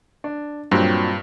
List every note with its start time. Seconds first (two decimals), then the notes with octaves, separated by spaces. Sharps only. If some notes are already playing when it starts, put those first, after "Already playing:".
0.24 D4
0.71 G2 A#2 F#3 C4